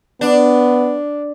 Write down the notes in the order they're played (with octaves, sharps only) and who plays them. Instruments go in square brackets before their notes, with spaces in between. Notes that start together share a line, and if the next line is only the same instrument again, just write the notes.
[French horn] B3 [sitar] D4